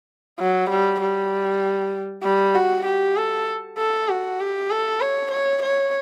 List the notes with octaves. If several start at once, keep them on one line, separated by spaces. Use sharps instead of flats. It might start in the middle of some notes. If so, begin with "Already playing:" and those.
F#3
G3
G3
G3
F#4
G4
A4
A4
F#4
G4
A4
C#5
C#5
C#5